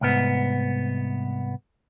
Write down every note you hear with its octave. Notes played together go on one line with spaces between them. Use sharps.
C2 G#2 B3